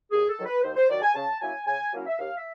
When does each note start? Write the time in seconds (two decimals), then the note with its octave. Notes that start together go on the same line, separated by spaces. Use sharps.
0.11 D#2 G#4
0.29 A4
0.38 D#3 F#3
0.46 B4
0.62 D#2 C5
0.75 C5
0.89 D#3 F#3 D5
1.02 G#5
1.14 C#3 A5
1.40 F#3 A#3 C#4 E4 G#5
1.66 C#3 G#5
1.93 F#3 A#3 C#4 E4
2.06 E5
2.18 D#2 F5
2.35 E5